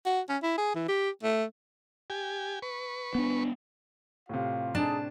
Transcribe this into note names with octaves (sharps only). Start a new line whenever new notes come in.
F#4
C#4
E4
G#4
E3
G4
A3
G4 G#5
B4 C#6
B3 D4
A2 C3 F4 F5
D4 D#4 G#4 A5